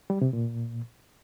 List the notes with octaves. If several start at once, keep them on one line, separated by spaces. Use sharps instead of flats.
G3
C3
A#2